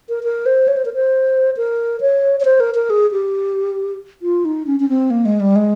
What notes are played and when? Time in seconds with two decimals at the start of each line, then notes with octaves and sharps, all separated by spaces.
0.09 A#4
0.24 A#4
0.46 C5
0.68 C#5
0.77 C5
0.85 A#4
0.94 C5
1.57 A#4
2.01 C#5
2.40 C#5
2.45 C5
2.60 A#4
2.75 A#4
2.90 G#4
3.12 G4
4.22 F4
4.45 D#4
4.67 C#4
4.80 C#4
4.89 C4
5.10 A#3
5.25 G#3
5.40 G3
5.56 G#3